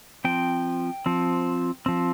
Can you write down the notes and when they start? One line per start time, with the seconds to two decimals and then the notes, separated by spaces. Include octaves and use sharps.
0.25 F3 C4 G5
1.06 F3 C4
1.86 F3 C4